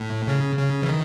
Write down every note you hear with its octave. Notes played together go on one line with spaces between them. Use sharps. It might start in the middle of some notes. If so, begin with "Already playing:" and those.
Already playing: A2
C#3
C#3
E3
D#3